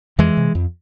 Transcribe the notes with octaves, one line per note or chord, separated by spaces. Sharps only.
F2 E3 G#3
C3
F2